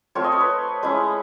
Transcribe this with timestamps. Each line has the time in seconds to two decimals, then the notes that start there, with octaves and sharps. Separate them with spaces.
0.15 A3 C4 F4 C#5
0.24 D#5
0.32 C#5
0.41 B4
0.83 G#3 C#4 E4